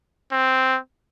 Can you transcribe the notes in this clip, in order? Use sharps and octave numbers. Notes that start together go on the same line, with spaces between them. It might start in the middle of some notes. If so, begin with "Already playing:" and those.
C4